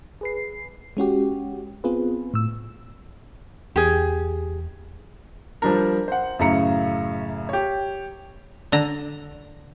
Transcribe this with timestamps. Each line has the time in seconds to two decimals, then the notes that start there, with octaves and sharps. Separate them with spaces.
0.21 G#4 B4 C7
0.97 G#3 C#4 F#4 G4
1.84 B3 C4 F4 G#4 B4
2.34 A2 E6
3.76 E2 G4 G#4
5.62 F3 G3 D4 A#4
6.08 C5 F#5
6.39 F#2 A2 C#3 E4 A#5 C#7
7.49 G4 C#5
8.72 D3 A#5